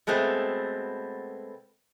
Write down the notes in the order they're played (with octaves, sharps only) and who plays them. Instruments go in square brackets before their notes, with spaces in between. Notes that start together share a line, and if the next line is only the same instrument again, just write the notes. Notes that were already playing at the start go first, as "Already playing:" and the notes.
[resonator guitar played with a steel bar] B2 G#3 A3 B3 C4